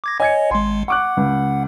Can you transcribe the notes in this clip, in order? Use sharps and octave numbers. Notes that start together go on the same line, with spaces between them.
D6 G#6 A#6
C#5 D#5 G#5 G#6 C#7
G#1 G#3 C6
F#5 C#6 D6 F#6
C#2